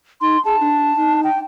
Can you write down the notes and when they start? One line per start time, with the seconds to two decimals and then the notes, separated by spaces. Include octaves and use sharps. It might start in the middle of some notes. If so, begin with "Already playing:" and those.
0.21 D#4 C6
0.45 G#4 A5
0.60 D4
0.97 D#4
1.24 G5